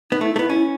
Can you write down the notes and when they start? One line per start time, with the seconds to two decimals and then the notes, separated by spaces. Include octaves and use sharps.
0.11 B3 D#4
0.21 A3 E4
0.36 A3 B3 E4
0.50 C#4 E4